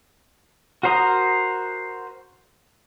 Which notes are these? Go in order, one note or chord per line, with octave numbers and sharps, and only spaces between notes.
F#4 A#4 C5 A#5 D#6